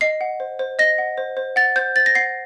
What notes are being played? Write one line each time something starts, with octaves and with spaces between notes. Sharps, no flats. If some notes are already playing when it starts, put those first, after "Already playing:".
D#5 C7
F#5
C5
C5
D#5 A#6
F#5
C5
C5
F#5 A6
C5 G6
C5 A6
A#6
F#5 C7